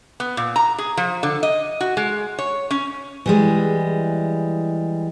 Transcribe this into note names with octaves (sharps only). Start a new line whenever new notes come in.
B3
A#2
A#5
G#4
F3
D3
D#5
F#4
G#3
C#5
C#4
E3 G3 G#3